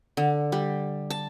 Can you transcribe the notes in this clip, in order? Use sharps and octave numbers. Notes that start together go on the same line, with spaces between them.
D3
G3
A5